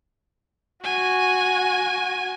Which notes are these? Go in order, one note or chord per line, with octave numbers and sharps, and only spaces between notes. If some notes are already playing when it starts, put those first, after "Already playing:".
F#4 G#5